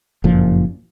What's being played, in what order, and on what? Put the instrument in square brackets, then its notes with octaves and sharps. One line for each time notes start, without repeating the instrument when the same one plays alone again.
[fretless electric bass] F#1 F2 A#2 F3